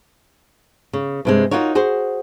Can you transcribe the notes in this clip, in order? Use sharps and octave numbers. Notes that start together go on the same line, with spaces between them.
C#3
G2 C3 G#3
D#4 F4 F#4 A#4 C#5
F#4 G#4 C5